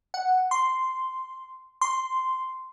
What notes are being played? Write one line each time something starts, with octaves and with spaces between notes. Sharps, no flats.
F#5
C6
C6